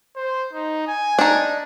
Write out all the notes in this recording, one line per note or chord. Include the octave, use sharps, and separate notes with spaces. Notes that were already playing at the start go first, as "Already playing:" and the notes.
C5
D#4
G#5
D4 D#4